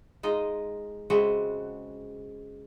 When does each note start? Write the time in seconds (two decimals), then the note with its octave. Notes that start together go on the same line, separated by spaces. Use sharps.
0.23 G#3 D#4 F4 D#5
1.10 C#3 G#3 C4 F#4 E5 F#5